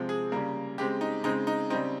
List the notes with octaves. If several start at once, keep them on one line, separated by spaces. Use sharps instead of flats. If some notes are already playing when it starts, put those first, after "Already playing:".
Already playing: C3 F3 G#3 C4
G#4
C#3 G3 A#3
C#3 G#3 C4 G4
D#4
C#3 G#3 C4 D#4
D#4
C#3 G3 C4 D#4